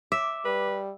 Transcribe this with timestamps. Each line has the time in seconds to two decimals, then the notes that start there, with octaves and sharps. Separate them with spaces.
0.12 E5 D6
0.45 G3 B4